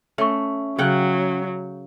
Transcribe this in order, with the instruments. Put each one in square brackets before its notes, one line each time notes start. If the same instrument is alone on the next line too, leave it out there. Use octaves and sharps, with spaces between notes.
[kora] A3 [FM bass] C#4 [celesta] E5 C#6
[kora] C#3 F#5 G5 [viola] F#3